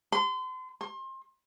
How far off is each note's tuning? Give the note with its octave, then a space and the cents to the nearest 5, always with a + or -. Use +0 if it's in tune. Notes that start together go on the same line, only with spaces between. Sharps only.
C6 -35
C6 +30